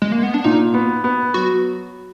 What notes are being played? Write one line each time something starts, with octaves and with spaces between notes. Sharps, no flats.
G#3
A#3
B3
D4
A#2 D#4
B3
B3
F#3 F#4